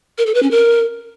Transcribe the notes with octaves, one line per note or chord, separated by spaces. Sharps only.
A#4
A4
B4
C#4
A#4